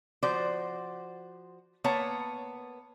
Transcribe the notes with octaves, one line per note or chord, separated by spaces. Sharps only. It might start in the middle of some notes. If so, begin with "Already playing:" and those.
F3 F#4 C5 D5
A#3 B3 C#5 A5 A#5